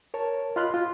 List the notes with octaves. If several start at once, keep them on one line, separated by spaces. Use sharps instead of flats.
A#4 C#5 A5
F4 D#5 B5 C6 F6 F#6
F4